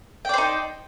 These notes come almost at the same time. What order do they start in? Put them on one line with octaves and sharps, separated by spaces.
G5 D5 C5 D#4